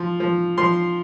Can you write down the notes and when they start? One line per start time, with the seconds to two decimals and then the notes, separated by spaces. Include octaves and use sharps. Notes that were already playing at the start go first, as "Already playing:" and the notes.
Already playing: F3
0.20 F3
0.58 F3 C6